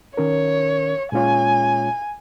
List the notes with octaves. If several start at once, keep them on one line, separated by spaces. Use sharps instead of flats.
D#3 C#4 A#4 C#5
A#2 G#3 C#4 F4 C#5 G#5